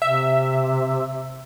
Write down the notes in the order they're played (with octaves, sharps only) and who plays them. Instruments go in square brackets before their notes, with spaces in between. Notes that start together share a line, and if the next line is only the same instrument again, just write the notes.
[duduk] C3 [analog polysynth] E5